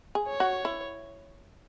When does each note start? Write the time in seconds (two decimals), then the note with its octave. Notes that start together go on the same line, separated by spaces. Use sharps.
0.15 G#4
0.28 C#5
0.40 F#4
0.65 E4